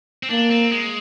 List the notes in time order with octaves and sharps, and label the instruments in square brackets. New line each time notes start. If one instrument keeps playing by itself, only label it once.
[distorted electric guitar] C4
[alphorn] A#3 [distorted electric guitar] D4
[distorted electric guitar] C4
G#3